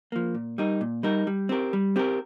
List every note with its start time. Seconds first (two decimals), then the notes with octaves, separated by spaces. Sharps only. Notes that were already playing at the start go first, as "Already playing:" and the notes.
0.12 F3 A#3
0.35 A#2
0.58 G3 D#4 A#4
0.81 A#2
1.03 G3 D#4 A#4
1.27 G3
1.49 C4 G4 A#4
1.73 G3
1.96 C4 G4 A#4